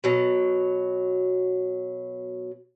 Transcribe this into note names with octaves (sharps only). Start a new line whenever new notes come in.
B2 F#3